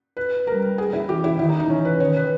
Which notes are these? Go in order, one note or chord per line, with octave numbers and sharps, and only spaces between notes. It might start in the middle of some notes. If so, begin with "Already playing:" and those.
B4
G3 A#4
G#4
E4
E3 G4
E4
D#3 E4
D#4
D#4
E3 C#4
B4
D#3 C#5
B4